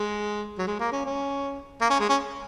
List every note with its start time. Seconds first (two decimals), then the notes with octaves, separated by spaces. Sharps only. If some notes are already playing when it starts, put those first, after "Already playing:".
Already playing: G#3
0.58 F#3
0.67 G#3
0.79 A#3
0.92 C#4
1.05 C#4
1.81 A#3
1.90 C#4
2.00 G#3
2.09 C#4